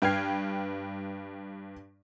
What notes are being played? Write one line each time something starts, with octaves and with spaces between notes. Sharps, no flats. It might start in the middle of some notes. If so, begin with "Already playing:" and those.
G2 B4 G5 F6 G#6 C7